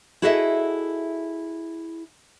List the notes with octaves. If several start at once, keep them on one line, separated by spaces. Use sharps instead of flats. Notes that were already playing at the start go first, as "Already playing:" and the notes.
E4 F#4 G#4 A4 D#5 E5